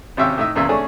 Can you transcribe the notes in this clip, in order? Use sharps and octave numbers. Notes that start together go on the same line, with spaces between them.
G#1 C3 C#4 E5 F5 G5
A2 D#4 E5
E2 A#2 C#3 E5
A3 C#4 D4 G#4